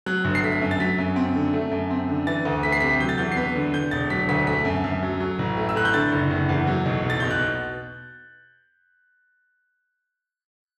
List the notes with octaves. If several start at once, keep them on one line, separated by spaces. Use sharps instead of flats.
F#3 F#6
G1
C7
A3 B6
F#2
A6
F#3 B6
F#2
C4
D3
A3
F#2
C4
D3
E3 A6
D2
A3 B6
C7
C3 B6
F#3 G6
A6
E2 G6
C7
B3 B6
D3
D3 G6
E1 A6
F#3 B6
D2 B6
A3 B6
F#2
F#2
F#3
F#3
A1
A3
E6
A2 F#6
G6
D3 A6
F#1
F#1
E2
F#3
B1
B1
A6
B2 G6
F#6